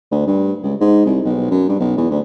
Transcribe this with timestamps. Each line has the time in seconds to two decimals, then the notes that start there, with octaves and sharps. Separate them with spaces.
0.12 D2
0.27 G2
0.64 C#2
0.81 G#2
1.06 C2
1.25 B1
1.51 F#2
1.69 G2
1.80 B1
1.97 E2
2.11 D2